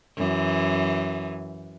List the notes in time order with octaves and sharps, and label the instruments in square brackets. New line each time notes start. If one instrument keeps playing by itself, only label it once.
[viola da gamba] F#2 E3